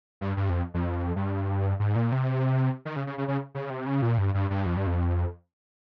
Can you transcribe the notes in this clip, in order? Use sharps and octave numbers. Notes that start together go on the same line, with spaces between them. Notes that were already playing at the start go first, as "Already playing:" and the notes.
G2
G2
F2
F2
G2
G#2
A#2
C3
D#3
C#3
C#3
C#3
C#3
C#3
C3
C#3
A#2
G2
G2
G2
F2
G2
F2